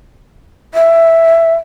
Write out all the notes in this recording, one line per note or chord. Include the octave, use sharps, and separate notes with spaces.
E5